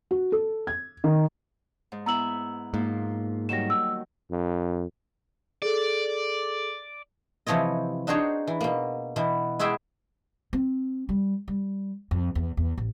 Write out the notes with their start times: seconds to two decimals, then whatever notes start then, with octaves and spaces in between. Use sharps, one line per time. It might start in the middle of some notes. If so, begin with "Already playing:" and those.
0.11 F#4
0.32 A4
0.67 G#6
1.04 D#3
1.92 G#2
2.06 B3 E4 E5 A#5 E6 F#7
2.74 G#2 F3 A#3
3.49 D#3 F#3 G3 A#6 E7
3.70 E6
4.31 F2
5.62 G#4 A4 D5
7.47 C3 E3 F3 C#5 D#5
8.07 D4 D#4 F#4 G#4 C5 C#5
8.47 E3
8.61 B2 A#3
9.16 B2 E3 B3
9.59 G#3 E4 F#4 G#4 E5 G5
10.53 C4
11.09 G3
11.48 G3
12.11 F2
12.35 E2
12.57 E2
12.78 A1